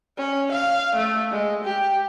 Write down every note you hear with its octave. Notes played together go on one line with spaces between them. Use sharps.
C#4
F5
A3
G#3
G4